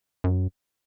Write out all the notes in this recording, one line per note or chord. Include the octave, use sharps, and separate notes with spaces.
F#2